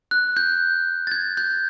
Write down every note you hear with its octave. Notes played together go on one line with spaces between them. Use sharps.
F#6
G6
A6
G#6
G6